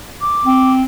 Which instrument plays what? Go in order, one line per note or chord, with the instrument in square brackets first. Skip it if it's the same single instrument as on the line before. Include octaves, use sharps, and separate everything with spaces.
[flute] D6
[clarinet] C4